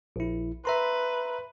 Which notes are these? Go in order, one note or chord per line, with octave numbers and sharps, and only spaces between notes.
A#1 E4
B4 E5 A#5 C6